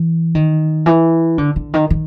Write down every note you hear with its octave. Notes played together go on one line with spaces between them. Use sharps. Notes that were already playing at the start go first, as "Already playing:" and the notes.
Already playing: E3
D#3
E3
D3
D3
D#3
D#3